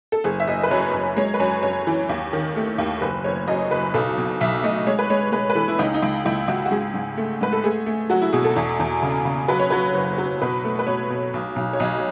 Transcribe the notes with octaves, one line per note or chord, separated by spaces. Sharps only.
A4
F#1 G#4
E5
F#1 D#5
B4
F#2 C#5
F#2
G#3 C#5
B4
F#2 C#5
F#2 C#5
E3
D#2
D#3
A3
D#2
F#1 B4
F#1 C#5
F#2 D#5
F#1 B4
B1 A4
B2
B1 E5
A3 D#5
G#3 C#5
B4
G#3 C#5
G#3 B4
B4
E3 A4
E4
C#2 D#4
D#4
C#2
C#2 E4
C#2 F#4
F#4
G#2 G#4
G#2
A3
G#2 B4
A4
A3 G#4
A3
F#3 F#4
E4
B2 G#4
A4
E2
E2
C#3
C#3
F#3 B4
C#5
F#3 B4
F#1
F#3
B2 B4
A3
B4
B2 C#5
B2
B1
B1
C#5
B1 D#5